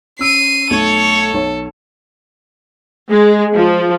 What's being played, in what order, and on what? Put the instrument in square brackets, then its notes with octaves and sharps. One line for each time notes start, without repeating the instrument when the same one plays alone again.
[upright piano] C#4 E6 D7 [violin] C7 D#7
[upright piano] B1 A3 [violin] A4 [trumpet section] C#5
[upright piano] B1 C#5
[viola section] G#3
F3